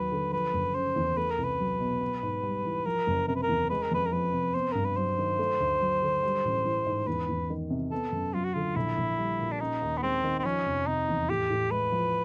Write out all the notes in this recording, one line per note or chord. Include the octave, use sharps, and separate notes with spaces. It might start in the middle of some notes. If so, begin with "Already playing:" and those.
Already playing: D#2 F#3 B4
D3
F3 B4
F#1
C#3 C5
E2
A3 B4
A#4
C2
B4
F#3
B2
B3
G#2
G3
E3
F3 A#4
F#1
C3 A#4
B4
A#4
E2
G#3 B4
A#4
F2 B4
A#4
F3 B4
C3
B3 C5
G2 A#4
B4
F#3 C5
D#3
A3
D2
F#3
D3
G3
A1
E3
G#2
E2 B4
E2
D#3
C3
B3 A4
F#2
F#3 F4
F#4
D3 F4
A#1 E4
A#1
G3
A#2
D4
C#4 D#4
D#2
B3
G#3 C4
D#3
C4
F3 C#4
F1
C3 D#4
E2
A2 G4
A2
G#3 B4
F3